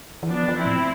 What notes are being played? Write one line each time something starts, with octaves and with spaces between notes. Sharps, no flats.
E3
F3 B3 D4
F3
C4 E4
A2